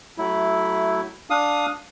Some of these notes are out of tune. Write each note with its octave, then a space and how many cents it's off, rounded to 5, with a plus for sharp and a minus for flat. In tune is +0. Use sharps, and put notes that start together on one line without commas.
F#3 +25 A3 +0 E4 -5
D4 +0 F5 +20 D#6 +0